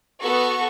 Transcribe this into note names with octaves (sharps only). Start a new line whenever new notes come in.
B3 F#4 A4 C#6